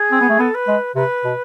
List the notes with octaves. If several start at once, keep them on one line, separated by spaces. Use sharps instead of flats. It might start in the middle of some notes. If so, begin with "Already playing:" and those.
Already playing: G#4
C4
B3
A3
B3 A4
B4
G#3
C3 B4
B2